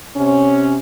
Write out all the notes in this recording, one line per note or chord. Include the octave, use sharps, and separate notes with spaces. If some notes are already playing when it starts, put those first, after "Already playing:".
C3 C#4